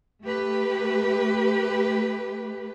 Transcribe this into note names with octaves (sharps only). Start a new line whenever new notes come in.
A3 G4 B4